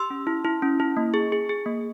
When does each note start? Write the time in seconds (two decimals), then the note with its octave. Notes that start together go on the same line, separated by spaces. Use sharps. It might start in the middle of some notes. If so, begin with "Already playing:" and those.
Already playing: G4 C6 E6
0.10 C#4
0.27 E4
0.44 E4
0.62 C#4
0.80 E4
0.97 A#3
1.14 G#4
1.32 G#4
1.49 G#4
1.66 A#3